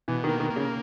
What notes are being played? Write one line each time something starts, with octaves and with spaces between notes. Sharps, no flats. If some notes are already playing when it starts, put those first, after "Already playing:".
B2 E3
D#3
A#3
D#3
A#3
C#3